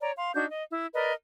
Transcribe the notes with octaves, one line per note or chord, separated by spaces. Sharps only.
C#5 D5 A#5
F5 C6
D4 D#4 F#4 G6
D#5
E4
A#4 B4 D5 D#5